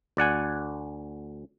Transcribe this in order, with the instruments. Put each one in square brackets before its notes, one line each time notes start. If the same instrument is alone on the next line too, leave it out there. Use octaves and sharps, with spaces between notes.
[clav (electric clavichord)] D2 D5 F#5 G#5